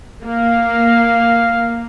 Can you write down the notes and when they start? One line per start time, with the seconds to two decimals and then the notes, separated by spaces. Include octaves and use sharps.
0.25 A#3 F5